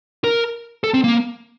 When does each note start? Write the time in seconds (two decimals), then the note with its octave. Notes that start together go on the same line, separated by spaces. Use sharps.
0.24 A#4
0.84 A4
0.94 C4
1.04 A#3